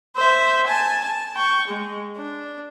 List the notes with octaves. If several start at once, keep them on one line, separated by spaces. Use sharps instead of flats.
C5 E5
G#5 A5
A5
G5 C#6
G#3
D4